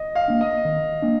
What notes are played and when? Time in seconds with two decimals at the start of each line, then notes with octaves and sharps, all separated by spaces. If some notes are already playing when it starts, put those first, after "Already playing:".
Already playing: D#5
0.15 F5
0.28 A#3 D4
0.41 D#5
0.65 D#3
1.02 A#3 D4